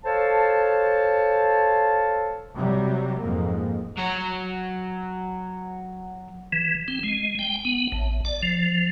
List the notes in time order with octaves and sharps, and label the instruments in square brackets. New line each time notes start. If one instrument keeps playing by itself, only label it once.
[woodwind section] A4 C5 C#5 F5 A5
[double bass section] C3 F#3 G3
F2 G#2 A#3
[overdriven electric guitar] F#3 C#5
[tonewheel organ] E3
C4
G#3
G5
B3
A1
D5
F3